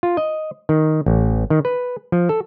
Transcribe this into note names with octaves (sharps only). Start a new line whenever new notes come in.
F4
D#5
D#3
A1
D#3
B4
F3
A4